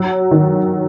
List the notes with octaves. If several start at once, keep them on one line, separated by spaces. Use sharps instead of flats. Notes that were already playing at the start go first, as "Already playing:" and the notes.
Already playing: F#3
D#3